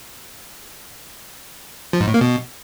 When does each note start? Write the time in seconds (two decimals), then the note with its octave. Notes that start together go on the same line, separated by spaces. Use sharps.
1.93 F3
2.00 G#2
2.07 A2
2.14 A#3
2.21 B2